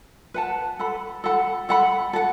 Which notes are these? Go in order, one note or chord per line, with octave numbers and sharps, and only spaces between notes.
B4 F#5 A5
A4 F#5 B5
A4 F#5 B5
A4 F#5 B5
A4
F#5